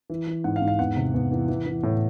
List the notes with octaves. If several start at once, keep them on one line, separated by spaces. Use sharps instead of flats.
E3
E3
G#2 F#5
F5
G#2
F5
E2 F#5
C3
E2
E3
E3
E3
A2